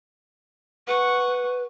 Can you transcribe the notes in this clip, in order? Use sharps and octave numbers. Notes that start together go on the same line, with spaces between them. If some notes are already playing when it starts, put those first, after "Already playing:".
B4 F#5 C#6